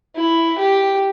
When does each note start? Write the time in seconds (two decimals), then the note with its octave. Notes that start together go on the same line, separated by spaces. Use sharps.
0.16 E4
0.58 G4